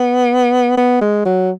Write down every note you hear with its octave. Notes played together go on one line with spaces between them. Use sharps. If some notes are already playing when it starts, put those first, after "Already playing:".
Already playing: B3
B3
G#3
F#3